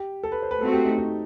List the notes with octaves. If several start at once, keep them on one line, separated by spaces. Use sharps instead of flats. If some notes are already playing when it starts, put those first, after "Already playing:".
Already playing: G4
A4
B4
C5
B4
A3 C4 F#4 A4
G4
D#4
D#4